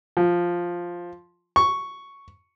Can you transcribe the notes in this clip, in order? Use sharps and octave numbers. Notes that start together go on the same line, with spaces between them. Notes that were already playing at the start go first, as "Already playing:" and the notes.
F3
C#6